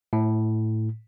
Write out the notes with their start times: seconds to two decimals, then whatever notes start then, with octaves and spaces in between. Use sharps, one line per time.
0.13 A2